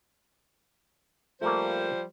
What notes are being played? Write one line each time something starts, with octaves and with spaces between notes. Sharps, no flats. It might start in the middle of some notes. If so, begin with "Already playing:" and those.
F3 G3 A3 A#3 C5